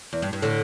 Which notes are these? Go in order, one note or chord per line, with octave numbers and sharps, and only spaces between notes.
E2
G2
G2
A2 D3